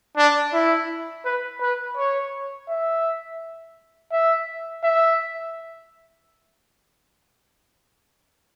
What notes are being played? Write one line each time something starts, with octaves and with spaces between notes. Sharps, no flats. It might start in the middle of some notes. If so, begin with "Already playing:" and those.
D4
E4
B4
B4
C#5
E5
E5
E5